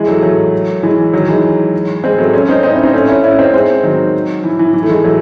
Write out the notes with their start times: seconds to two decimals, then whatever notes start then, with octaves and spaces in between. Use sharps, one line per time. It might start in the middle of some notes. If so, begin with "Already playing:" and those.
Already playing: E3 G#3
0.08 F#3 A3
0.23 F#3 A3
0.83 E3 G#3
1.14 D#3 F#3
1.28 E3 G#3
2.03 G#3 C4
2.18 F#3 A3
2.33 A3 C#4
2.48 C4 D#4
2.63 C4 D#4
2.73 C#4 E4
2.83 C4 D#4
2.94 A3 C#4
3.09 C#4 E4
3.24 C#4 E4
3.39 C4 D#4
3.54 G#3 C4
3.84 D#3 F#3
4.44 E3
4.59 E3
4.74 E3
4.83 A3
4.89 E3 G#3
5.04 F#3 A3